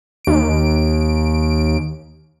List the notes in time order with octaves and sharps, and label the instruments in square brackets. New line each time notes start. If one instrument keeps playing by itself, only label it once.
[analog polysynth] D#2 D7